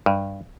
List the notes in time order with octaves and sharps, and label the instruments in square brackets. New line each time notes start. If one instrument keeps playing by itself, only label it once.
[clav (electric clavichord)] G2